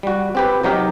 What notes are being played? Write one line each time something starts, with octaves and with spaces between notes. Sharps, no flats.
G3 F#4
C4 G4 B4
C3 F#3 D#4 G4 A#4